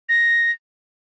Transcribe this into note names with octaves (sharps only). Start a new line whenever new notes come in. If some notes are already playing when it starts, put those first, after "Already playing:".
A#6